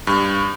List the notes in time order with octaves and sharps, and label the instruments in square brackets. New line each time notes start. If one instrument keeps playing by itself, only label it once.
[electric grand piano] G2